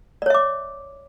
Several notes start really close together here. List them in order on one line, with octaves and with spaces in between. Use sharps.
D5 C#5 E5 D6